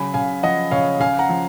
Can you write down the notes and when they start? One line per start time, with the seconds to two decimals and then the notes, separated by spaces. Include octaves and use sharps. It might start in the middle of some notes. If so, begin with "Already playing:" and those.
Already playing: C#3 F#3 G#5 B5
0.14 C#3 F5 G#5
0.43 F3 D#5 F#5
0.71 C#3 C#5 F5
1.00 C#3 F5 G#5
1.19 F#5 A#5
1.29 F3